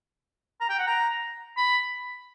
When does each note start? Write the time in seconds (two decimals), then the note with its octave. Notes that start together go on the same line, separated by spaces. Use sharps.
0.61 A#5
0.69 G5
0.78 F#5
0.87 A#5
1.57 B5